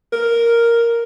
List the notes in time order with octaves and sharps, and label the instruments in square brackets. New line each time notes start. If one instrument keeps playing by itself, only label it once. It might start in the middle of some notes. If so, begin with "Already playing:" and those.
[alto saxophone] A#4